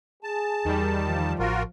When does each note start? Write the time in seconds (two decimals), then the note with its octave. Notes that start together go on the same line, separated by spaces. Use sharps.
0.23 G#4 A5
0.65 E2 D#3 G3
1.07 F3
1.39 A1 F4 F#4 A#4